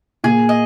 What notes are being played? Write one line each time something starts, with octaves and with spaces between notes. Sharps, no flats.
A#2 G#4
D#5